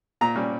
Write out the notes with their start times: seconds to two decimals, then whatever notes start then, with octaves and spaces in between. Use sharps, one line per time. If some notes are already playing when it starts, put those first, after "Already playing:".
0.21 A#2 A#5
0.36 G3 C#4